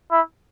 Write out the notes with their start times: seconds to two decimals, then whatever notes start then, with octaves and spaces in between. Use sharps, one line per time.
0.11 E4